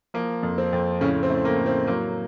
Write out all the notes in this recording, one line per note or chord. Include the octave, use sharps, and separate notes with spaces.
F3 A#3
F2
C4
F2
A2 C#3 C#4
C4
A3
A#3
A2
C4
F#3 A#3